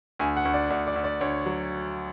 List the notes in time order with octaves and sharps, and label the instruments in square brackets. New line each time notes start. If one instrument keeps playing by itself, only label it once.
[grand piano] D2 G#5
F#5
D2
D5
D2 D5
D5
D2
D5
D2 C#5
F#3